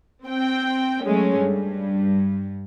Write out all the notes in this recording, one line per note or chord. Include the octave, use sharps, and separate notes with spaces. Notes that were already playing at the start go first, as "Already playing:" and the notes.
C4 G5
F#3 G#3 A3 C#4
G2